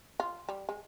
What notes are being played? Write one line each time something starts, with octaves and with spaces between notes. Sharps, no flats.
F4
G3
G#3